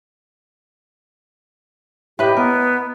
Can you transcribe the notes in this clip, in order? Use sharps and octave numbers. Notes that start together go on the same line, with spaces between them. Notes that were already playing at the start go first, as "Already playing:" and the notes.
A2 G4 B4 D#5
B3 A#4